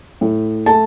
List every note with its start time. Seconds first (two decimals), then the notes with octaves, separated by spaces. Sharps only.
0.21 A2
0.66 A3 A5